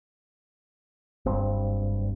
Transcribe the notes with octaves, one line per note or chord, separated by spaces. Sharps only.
F#1 G2 C4